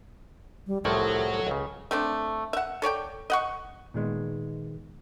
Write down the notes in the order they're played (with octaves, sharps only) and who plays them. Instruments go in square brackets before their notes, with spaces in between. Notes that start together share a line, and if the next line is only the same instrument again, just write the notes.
[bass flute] G3
[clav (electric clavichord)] C2 A2 F3 [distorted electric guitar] F#4 C#5 [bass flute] A4
[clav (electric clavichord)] C#2 C#3
[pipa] A3 C4 D4
E5 F#5
A4 C#5 D5 G5
D#5 F#5 C#6
[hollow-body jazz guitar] A#2 D#3 G#3 B3